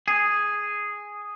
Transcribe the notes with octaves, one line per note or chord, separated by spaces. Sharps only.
G#4